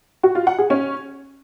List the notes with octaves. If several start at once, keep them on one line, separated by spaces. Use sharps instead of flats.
F#4
F4
F#5
G#4
C#4